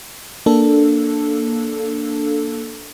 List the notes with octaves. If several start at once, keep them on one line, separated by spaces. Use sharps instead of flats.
A#3 D4 A4